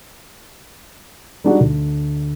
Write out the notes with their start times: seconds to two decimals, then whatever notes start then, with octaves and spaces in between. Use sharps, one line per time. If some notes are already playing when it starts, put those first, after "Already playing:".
1.44 G3 G#3 D4 D#4 F#4
1.61 D2